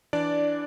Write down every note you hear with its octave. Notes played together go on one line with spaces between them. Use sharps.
E3 D4 D5